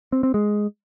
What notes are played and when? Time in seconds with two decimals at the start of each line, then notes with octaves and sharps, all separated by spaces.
0.12 C4
0.23 C4
0.34 G#3